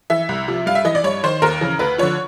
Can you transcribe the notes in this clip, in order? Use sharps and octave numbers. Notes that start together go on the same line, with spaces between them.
E3 E5
C2
C3 F3
G2 F5
E5
E3 D#5
D5
G2 C#5
D#3 C5
D#2 A#4
C#3 E3
D2 B4
D3 F3 C#5